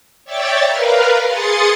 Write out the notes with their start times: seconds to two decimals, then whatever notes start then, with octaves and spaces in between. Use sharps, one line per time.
0.25 C#5 D5 E5 G5 A6
0.66 A#4 B4 F5
1.27 G#4 C6 D#6 A6 C#7